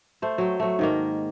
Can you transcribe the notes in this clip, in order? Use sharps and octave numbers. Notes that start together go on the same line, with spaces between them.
A3 C5
F#3 G5
F#3 A3
G#2 D#3 A#3